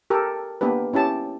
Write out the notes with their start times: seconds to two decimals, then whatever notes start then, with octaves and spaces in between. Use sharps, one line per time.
0.10 G4 A4 A#4
0.61 A#3 B3 D4 G4 B4
0.93 C#4 E4 G4 A5